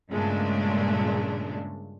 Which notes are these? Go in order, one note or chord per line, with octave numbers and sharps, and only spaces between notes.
G2 A#2 C#3 G#3 A3 D4